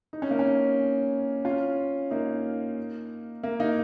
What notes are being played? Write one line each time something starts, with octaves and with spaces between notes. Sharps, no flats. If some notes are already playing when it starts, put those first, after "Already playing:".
D#4
C#4
A#3
C#4
C#4 F4
A#3 D#4
A#3
A#3 D#4